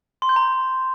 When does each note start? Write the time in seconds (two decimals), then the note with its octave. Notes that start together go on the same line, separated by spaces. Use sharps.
0.22 C6
0.29 G6
0.36 A#5